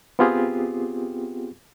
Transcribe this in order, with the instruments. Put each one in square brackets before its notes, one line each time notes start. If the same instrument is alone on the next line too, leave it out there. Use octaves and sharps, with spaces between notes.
[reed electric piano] B3 C4 F4 G4 G#4